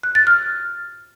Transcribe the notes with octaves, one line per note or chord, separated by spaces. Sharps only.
F#6
A6
F6